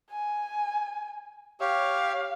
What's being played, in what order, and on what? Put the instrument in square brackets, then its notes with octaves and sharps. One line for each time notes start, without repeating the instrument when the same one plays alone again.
[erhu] G#5
[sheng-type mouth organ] G4 C#5 [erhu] F5